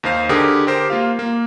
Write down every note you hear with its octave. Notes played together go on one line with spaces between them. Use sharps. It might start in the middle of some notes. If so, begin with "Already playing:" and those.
D#2 D#4 C5 F5
D3 G4 G#4 A#4 D#6
G4 A#4 C5
A#3 F4 F5
A#3